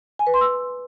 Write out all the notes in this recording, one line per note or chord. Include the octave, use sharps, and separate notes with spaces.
G#5
B4
C6
E6